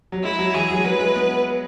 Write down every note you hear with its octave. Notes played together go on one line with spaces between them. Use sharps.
F#3
G#3 E4
F#3
E3 G#4
F#3
G#3
F#3 B4
G#3
B3